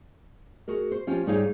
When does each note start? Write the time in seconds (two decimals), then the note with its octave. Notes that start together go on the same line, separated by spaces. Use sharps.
0.68 F#4 G#4 A#4
0.91 C5
1.07 F3 C#4 F4 G4
1.26 G#2 G3 D#4 G#4 C#5 F5